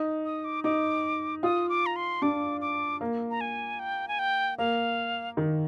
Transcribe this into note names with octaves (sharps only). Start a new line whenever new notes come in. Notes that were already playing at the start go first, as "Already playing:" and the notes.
Already playing: D#4
D#6
D6
D#4 D6
F4 D#6
D6
A#5
C6
D4 D6
D6
A#3
A#5
G#5
G5
G#5
G5
A#3 F5
D#3